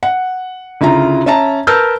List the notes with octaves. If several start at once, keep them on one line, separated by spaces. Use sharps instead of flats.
F#5
D2 C#3 E4 F4 A#5
C#4 E5 A5 A#5
A#4 B4 A5 E6 F6 G6